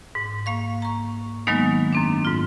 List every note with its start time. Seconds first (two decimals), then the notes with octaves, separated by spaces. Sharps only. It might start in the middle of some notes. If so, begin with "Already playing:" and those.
0.15 G#2
0.46 A#3 F5 C#6
0.82 A#5 C#6
1.47 D#3 F#3 G#3 A#3 B3 D#4
1.93 F#2 C4 D4
2.25 G#2 F4